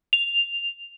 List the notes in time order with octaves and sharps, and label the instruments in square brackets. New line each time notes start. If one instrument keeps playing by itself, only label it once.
[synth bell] F7